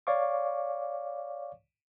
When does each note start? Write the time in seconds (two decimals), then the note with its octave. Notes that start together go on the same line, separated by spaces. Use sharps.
0.07 C#5 D5 F5 C#6 D6